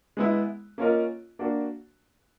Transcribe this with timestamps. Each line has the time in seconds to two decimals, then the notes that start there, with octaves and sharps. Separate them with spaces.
0.17 G#3 B3 E4
0.78 A#3 C#4 F4 A#4 D#5
1.39 A#3 D4 F#4